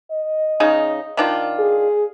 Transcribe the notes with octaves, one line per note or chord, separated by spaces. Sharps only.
D#5
C#3 D#4
D#3 D4 F4
G#4